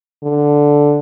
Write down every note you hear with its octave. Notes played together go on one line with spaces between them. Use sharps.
D3